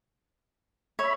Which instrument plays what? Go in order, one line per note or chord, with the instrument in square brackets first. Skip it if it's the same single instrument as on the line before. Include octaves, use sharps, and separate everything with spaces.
[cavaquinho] C#5 [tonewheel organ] E5 B5